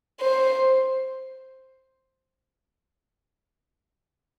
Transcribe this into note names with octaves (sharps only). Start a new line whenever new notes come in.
C5